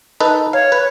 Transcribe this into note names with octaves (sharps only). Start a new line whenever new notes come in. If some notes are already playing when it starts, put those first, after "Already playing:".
D#4 A4 B4
C#5 F5
B4